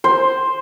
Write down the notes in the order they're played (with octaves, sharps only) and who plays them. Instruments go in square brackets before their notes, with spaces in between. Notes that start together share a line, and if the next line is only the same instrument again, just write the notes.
[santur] C5